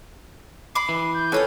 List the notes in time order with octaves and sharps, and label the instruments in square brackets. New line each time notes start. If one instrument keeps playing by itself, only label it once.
[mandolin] B5 D6 [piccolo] C7
[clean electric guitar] E3
[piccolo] G6
[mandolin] C#4 F4 G5 [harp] A4 B4 C#5